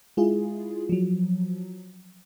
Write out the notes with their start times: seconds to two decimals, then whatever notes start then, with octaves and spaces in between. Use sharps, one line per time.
0.17 G#3 E4 F4 G#4
0.89 F3 F#3